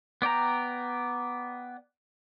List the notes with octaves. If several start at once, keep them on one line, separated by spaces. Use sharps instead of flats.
B3 D5 G5 A#5